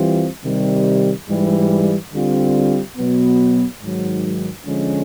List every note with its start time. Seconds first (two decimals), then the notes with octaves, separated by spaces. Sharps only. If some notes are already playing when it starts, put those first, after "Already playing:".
Already playing: E3 G3 C4 F4
0.44 C3 D#3 G3
1.29 G#2 E3 G3
2.13 D3 G3 C4 F4
2.97 B2 F#3 B3
3.82 G#2 D#3 F#3
4.66 D3 F3 G#3 C#4